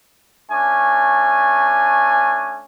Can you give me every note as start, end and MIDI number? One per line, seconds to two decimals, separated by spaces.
0.50 2.62 57
0.50 2.62 61
0.50 2.62 62
0.50 2.62 80